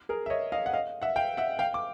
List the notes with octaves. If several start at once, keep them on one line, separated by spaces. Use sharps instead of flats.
G#4 A#4
E5
C#5 D#5
D#5 F5
F#5
D#5 F5
E5 F#5
F5 G5
E5 F#5
F5 G5
D6